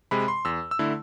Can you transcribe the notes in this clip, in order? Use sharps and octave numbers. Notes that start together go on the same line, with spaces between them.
C3 G#3 B5
C6
E2 E6
E6
D3 A3 E4